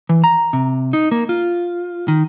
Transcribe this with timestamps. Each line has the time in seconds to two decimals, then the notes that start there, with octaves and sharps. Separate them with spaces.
0.09 E3
0.24 A#5
0.53 C3
0.93 D#4
1.11 A#3
1.29 F4
2.08 D#3